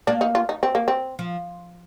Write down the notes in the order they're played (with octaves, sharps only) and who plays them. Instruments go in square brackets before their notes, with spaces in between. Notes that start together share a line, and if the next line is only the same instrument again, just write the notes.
[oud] A#3 [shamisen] D4
[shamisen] D#4
F4
D#4
C4
A#3
C4
[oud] F3